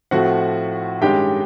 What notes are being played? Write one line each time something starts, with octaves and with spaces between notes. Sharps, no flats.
A2 F3 A3 C4 F#4 F#5
G2 D#3 G#3 C#4 G4 G5